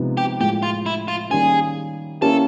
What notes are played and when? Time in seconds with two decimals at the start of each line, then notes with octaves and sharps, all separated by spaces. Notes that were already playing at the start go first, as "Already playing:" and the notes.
Already playing: C3 F3 G#3 B3 D#4
0.17 G4
0.40 A2 F3 G#3 G4
0.63 F4
0.86 E4
1.08 F4
1.30 D#3 G3 A#3 C#4 G#4
2.21 A#3 C#4 E4 G4 A4